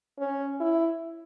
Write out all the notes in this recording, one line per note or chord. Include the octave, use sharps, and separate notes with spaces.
C#4
E4